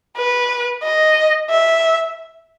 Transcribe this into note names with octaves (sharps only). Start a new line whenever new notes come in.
B4
D#5
E5